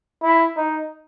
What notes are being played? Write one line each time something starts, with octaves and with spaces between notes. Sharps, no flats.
E4
D#4